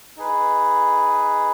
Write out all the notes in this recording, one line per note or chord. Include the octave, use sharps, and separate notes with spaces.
D#4 G#4 B4